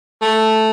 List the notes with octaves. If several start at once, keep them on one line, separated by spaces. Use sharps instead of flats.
A3